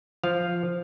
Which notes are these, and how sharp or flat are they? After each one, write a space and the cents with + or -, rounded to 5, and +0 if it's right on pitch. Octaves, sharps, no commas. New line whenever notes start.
F3 +0 F5 +0